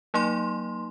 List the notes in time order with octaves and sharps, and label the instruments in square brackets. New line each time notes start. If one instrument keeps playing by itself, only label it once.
[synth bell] F#3 A#3 D#4 C6